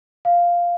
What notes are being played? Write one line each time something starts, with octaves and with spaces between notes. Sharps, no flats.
F5